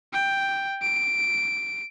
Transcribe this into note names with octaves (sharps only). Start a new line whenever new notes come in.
G5
D7